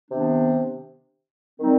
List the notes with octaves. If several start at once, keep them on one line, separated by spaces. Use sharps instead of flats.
C3 D#3 B3 D4
D#3 G3 C4 D#4